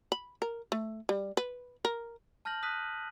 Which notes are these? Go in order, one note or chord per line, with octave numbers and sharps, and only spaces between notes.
B5
A#4
A3
G3
B4
A#4
A5 F6 G6 A#6 F#7
D#6 F#6 B6 D#7